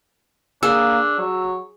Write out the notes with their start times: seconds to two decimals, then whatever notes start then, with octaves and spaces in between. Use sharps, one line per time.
0.63 A#3 D4 G#4 E6
1.19 F#3 C#5